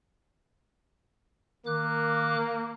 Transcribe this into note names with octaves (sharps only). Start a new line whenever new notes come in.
D#3 A#3 D6 F#6